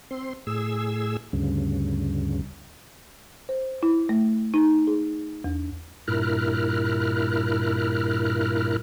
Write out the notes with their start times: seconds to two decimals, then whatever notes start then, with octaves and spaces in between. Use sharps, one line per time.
0.11 C4 C6
0.47 A2 G#4 E6
1.33 D2 G2 C#3
3.49 C5
3.83 E4
4.09 A3
4.54 D#4
4.87 G#4
5.44 E2
6.08 G2 A#2 E4 A#4 F6 F#6